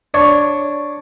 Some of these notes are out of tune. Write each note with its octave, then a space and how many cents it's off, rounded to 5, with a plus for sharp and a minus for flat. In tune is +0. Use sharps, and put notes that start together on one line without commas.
D4 +0 C#5 +0